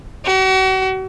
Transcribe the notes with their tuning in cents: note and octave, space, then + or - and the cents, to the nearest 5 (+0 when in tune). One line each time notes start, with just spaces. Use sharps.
F#4 +40